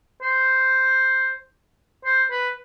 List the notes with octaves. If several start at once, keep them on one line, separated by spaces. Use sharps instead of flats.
C5
C5
B4